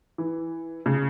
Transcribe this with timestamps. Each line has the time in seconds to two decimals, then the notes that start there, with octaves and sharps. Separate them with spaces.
0.18 E3
0.86 C#3